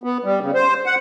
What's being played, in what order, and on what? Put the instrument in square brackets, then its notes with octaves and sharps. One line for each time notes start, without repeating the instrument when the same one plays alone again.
[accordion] B3
G3
C#3
C5
F#5